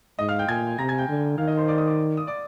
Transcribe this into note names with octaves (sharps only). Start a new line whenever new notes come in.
G#2 D#5 D#6
F5 F6
G5 G6
A#2 G#5 G#6
C3 A#5 A#6
G#5 G#6
G5 G6
D3
D#3 F5 F6
D#5 D#6
C5 C6
D5 D6
D#5 D#6
D5 D6
D#6
D5 D6